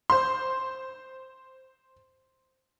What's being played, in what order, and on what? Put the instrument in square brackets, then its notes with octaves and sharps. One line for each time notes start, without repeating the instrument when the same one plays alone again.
[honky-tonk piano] C5 C6